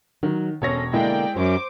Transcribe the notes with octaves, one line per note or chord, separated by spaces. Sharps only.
D#3 F#3
E1 C4 C#4 A4 C#5 A#6
B2 D3 G#3 A#3 E4 D5 G5
F#2 C5 C#5 D6